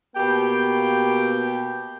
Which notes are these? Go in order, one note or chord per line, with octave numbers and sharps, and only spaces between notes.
B2 A#3 G4 G5